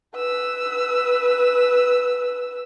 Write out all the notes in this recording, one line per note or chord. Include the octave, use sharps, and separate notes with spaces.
B4 E6